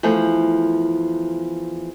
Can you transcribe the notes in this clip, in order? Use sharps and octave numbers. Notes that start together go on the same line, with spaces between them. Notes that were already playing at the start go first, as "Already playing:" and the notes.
E2 F3 A3